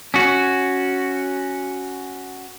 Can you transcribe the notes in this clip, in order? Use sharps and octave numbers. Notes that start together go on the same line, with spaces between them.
C#4 F#4